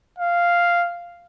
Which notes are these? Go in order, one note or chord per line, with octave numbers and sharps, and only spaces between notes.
F5